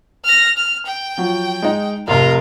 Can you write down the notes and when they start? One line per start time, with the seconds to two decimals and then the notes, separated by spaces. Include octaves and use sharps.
0.25 F6 A#6
0.57 F6
0.86 G5
1.18 F3 F#3
1.62 G#3 D#4
2.08 F1 F2 F4 A#4